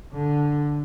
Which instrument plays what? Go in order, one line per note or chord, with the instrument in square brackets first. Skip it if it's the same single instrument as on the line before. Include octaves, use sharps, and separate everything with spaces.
[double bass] D3